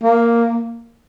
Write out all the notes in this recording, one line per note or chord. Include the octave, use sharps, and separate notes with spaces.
A#3